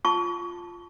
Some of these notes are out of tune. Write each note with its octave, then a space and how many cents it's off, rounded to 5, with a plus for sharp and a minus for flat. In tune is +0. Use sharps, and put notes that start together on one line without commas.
F4 +0 A5 +0 C#6 +30